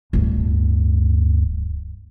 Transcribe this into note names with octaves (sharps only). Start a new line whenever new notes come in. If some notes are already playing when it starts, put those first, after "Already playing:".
D1 G2